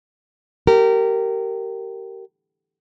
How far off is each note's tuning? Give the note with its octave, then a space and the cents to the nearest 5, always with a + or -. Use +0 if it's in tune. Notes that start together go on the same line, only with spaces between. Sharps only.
G4 -20 A#4 -20